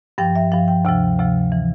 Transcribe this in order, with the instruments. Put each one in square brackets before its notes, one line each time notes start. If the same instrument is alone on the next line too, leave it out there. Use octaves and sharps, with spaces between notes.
[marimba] G2 F3 G5
E5
G2 F3 F5
G5
D2 C3 F3 G5
D2 C3 F3
E3